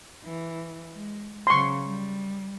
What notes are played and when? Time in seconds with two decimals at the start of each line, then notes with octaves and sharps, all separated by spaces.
0.25 E3
0.94 G#3
1.47 C#3 F#3 C6 C#6
1.85 G3